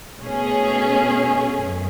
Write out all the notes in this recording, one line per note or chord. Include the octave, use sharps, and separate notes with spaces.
B2 A3 C#4 G#4
F#2